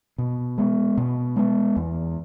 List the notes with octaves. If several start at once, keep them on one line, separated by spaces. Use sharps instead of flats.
B2
G#3 B3
B2
G#3 B3
E2